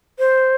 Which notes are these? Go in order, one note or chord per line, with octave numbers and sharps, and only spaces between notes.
C5